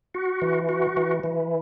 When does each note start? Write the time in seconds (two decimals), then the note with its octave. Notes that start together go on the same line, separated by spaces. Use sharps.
0.14 F#4
0.42 E3
0.69 F#4
0.97 E3
1.24 E3